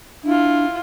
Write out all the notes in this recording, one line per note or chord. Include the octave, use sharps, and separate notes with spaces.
D4 E4 F4